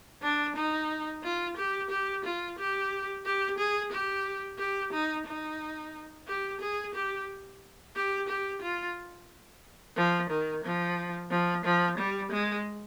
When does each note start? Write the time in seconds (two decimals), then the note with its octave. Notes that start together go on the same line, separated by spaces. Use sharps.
0.23 D4
0.57 D#4
1.23 F4
1.57 G4
1.90 G4
2.25 F4
2.58 G4
3.25 G4
3.58 G#4
3.92 G4
4.59 G4
4.93 D#4
5.27 D#4
6.27 G4
6.61 G#4
6.95 G4
7.95 G4
8.29 G4
8.62 F4
9.96 F3
10.30 D#3
10.64 F3
11.31 F3
11.65 F3
11.98 G3
12.31 G#3